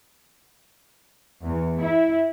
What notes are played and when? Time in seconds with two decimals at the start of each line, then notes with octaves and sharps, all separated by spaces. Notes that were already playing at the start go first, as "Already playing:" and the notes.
1.41 E2
1.79 E4